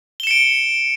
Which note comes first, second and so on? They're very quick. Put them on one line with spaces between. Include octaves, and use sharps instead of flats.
G7 E7 C#7 D7